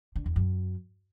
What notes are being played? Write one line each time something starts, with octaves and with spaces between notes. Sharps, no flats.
D3
E2
F#2